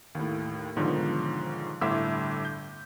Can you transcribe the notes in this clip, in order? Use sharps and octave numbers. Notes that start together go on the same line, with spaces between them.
D#2 A2
B1 G#2 D3 D#3 F3
G1 A2 E5 C6 D6 E6
G6